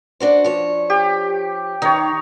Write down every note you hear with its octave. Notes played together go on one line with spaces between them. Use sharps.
D4 F#4 C5
F3 C#5
G4
D#3 D#4 C#5